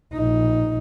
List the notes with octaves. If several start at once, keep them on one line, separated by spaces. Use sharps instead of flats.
A#1 D#4